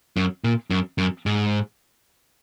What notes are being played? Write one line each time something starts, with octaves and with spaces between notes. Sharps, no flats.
F#2
A#2
F#2
F#2
G#2